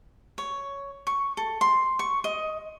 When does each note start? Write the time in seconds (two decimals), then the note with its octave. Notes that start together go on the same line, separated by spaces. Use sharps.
0.38 C#5
1.07 C#6
1.37 A4
1.61 C6
1.99 C#6
2.24 D#5